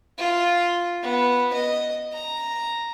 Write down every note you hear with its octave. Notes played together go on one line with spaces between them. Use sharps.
F4
B3
D#5
A#5